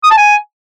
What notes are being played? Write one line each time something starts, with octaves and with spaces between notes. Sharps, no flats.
D#6
A5
G#5